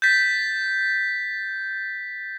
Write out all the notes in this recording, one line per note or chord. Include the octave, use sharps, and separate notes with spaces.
G6 A6 B6